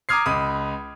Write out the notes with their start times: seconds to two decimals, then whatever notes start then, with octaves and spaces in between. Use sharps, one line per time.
0.09 A#5 D6 D#6 F6 G#6 C7
0.26 C#2 B5 D#6 D#7